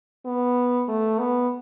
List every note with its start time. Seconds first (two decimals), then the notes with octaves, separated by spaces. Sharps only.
0.26 B3
0.88 A3
1.19 B3